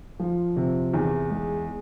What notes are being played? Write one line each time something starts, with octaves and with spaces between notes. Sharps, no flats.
F3
C3
E2
G#3